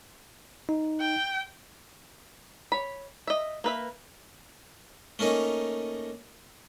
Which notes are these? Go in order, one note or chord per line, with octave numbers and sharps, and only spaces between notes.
D#4
G5
C#5 B5
D#5 E5
A#3 B4 E5
A3 A#3 C#4 D#4